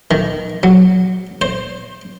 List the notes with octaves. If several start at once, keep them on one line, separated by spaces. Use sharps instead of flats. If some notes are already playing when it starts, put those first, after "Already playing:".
D#3
F#3
C5